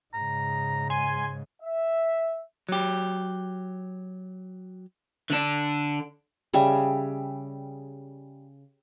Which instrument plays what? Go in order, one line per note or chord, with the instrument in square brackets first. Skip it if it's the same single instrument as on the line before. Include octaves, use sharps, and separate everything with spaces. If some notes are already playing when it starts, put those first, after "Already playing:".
[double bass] G#2 C#3 [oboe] A#5
[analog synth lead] G#5 [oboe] C6
[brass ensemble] E5
[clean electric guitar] F#3 G4
[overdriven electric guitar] D3 D4
[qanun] C#3 G3 E5